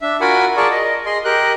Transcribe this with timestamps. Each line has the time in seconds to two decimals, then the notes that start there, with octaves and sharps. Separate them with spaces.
0.02 D4 E5
0.21 F4 F#4 A#4 F#5 G#5 B5
0.57 F4 G#4 A#4 D5 A5 C#6
0.71 D#5
1.06 G#4 D#5 C6
1.25 G4 A#4 D#5 F#6